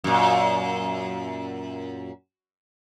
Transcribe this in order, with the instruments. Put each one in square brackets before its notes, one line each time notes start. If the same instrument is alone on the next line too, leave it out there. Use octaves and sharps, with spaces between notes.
[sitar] F#2 A#2